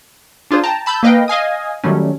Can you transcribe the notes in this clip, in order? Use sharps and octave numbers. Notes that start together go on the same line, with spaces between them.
D4 F4 G#4 C5
G5 A5 A#5
A5 B5 E6 G6
A#3 B4 D#5 F5 G5
D#5 F5 G#5 D#6
D#3 F#3 G3 A3 C#4